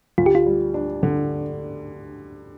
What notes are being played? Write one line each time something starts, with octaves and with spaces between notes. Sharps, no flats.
D2 F4
G4
F4
G3
D4
D3